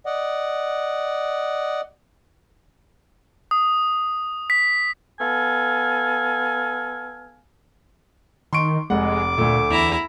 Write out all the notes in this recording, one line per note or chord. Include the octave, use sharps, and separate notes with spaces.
D5 D#5 F#5
D#6
B6
B3 A4 F5 G#5
D#3 C6 C#6 D7
F1 G#3 F#5 D6
D2 A#2 A3
E2 E4 A#5